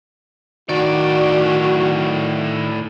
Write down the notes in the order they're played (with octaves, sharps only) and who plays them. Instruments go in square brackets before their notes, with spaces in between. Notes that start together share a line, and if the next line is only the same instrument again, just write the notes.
[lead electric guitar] A2 D5 [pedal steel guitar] D#3 [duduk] F#4